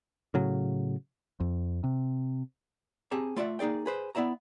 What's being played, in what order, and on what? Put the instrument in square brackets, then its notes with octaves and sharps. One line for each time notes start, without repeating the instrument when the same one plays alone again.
[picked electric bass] A2 C#3 F#3
[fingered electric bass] F2
C3
[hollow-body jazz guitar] C4 G4 G#4 A5 A#5
A3 F4 D5 E5 F#5
A#3 D#4 G#4 D5 G5
G#4 B4 C5
B3 E4 D5 E5 A#5